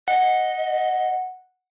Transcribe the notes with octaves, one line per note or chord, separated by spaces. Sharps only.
D#5 F#5